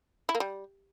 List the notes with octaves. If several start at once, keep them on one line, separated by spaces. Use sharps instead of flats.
E4
A#3
G3